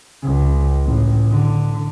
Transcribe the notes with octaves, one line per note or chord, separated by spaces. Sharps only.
C#2
A1
D3